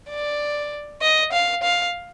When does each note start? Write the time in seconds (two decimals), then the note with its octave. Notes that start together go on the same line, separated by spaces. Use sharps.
0.09 D5
1.02 D#5
1.33 F5
1.63 F5